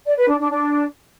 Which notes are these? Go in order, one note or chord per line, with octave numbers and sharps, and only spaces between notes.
D5
B4
D4
D4
D4